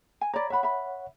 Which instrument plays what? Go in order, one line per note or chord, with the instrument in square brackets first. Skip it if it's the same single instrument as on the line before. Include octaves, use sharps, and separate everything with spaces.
[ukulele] G#5
[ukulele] C#5 D5 [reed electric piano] A#5 B5
[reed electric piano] C#5 F#5 [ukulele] E5 B5
[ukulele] E5 B5